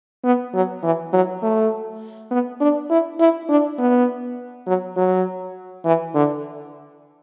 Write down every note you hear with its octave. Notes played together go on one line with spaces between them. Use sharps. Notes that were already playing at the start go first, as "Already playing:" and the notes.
B3
F#3
E3
F#3
A3
B3
D4
E4
E4
D4
B3
F#3
F#3
E3
D3